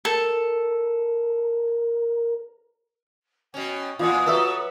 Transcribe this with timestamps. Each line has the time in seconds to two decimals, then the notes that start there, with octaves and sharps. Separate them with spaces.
0.05 A4 A#4
3.54 B2 C#4 G5
3.99 A#2 E3 F4 F#5 D#6
4.26 F#3 A4 B4 E5